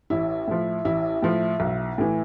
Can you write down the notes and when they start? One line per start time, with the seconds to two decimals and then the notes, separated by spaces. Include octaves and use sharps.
0.10 A1 E4
0.48 A2 F3
0.85 A1 E4
1.22 A2 F3
1.60 B1
1.98 A2 E3